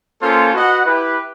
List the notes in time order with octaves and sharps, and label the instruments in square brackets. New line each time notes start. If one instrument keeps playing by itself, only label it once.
[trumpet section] A#3 C#4 F4 A4 C5
F#4 B4 D#5 F#5
E4 G4 B4